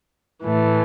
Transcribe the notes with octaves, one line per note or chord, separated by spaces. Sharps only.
A2 E3 A3